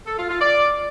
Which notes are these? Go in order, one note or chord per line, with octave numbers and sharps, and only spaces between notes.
A4
F4
F4
D5